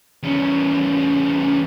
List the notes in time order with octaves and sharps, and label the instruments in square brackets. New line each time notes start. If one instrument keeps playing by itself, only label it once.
[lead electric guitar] E2 C#4